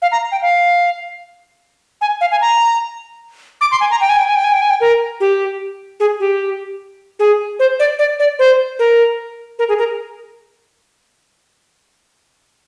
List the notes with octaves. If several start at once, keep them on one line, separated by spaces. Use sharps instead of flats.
F5
A#5
G5
F5
G#5
F5
G#5
A#5
D6
C6
G#5
A#5
G5
G#5
G5
G#5
G5
G#5
G5
G#5
G5
A#4
G4
G#4
G4
G#4
C5
D5
D5
D5
C5
A#4
A#4
G#4
A#4